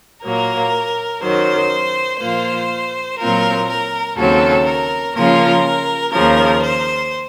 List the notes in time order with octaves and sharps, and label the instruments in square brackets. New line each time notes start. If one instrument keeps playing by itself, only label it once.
[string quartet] A#2 F#3 A#3 A#4
F#2 D#3 F#3 C5
A#2 F3 A#3 F4 C5
A#2 F#3 C4 F4 A#4
A#4
D#2 C#3 F#3 C4 A4
A#4
C#3 F3 A#3 F4 A#4
D#2 C#3 F3 A#4
C5